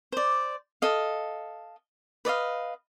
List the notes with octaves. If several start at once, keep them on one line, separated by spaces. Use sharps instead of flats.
C5 D5
A4 D#5 F5
B4 D5 D#5 F5